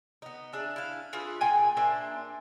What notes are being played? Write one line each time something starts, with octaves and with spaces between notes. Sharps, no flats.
B3 D#4
D4 G#4 E5
E4 F5
E4 F4 G#4 B4
A#2 G#4 G5 G#5
A#3 D4 C5 E5